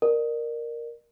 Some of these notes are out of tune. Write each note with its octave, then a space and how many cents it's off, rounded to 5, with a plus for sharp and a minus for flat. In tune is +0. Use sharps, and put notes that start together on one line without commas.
A#4 +0 D5 +40